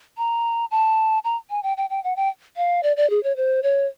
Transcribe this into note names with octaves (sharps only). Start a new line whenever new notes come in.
A#5
A5
A#5
G#5
G5
G5
G5
F#5
G5
F5
D5
D5
G#4
C#5
C5
C#5